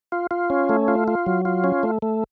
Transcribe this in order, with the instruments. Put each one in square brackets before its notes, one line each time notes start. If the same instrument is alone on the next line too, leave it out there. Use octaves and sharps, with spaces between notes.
[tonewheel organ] F4
F4
C#4
A3
F4
F4
F#3
F4
C#4
A3
A3